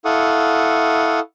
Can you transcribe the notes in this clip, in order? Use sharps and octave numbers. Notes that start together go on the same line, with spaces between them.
E4 A4 F5 F#5 C#6 D#6